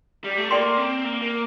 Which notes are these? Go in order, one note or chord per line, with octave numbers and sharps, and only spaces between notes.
G3
A3
A#3 A4 D5 G5 C6
C4
A#3
A#3